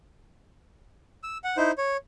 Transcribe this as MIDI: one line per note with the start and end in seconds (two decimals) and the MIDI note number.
1.23 1.38 88
1.44 1.57 78
1.57 1.72 63
1.57 1.72 64
1.57 1.72 72
1.78 1.97 73